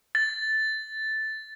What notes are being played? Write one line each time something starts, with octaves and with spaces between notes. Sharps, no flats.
A6